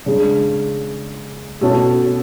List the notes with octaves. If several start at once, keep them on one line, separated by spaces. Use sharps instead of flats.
C#3 G#3 D4 G#4
B2 A3 C#4